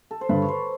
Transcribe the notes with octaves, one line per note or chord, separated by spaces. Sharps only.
A4
C5
G2 D3 B4
C#5
C5